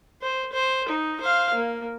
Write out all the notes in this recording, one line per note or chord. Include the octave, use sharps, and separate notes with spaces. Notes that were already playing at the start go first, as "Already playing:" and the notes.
C5
C5
D#4
C5 F5
A#3